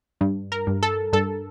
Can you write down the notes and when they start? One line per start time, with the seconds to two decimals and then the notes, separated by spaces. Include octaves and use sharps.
0.21 G2
0.52 A#4
0.67 G2
0.83 A4
1.13 G2 A4